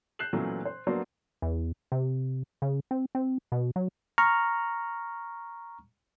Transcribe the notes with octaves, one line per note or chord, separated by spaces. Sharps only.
F#6 G6 C7 E7 F#7
A#2 E3 F#3 A3 B3 C#4
C5
F#3 A#3 B3 D4 F#4 C5
E2
C3
C#3
C4
C4
B2
F#3
A#5 C#6 F6